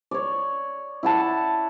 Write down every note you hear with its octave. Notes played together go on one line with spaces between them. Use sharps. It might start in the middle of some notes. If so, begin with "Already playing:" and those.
C#5 D5
E4 F#5 A5